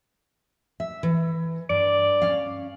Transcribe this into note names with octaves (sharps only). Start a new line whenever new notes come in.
E5
E3
G2 D5
C#4 F5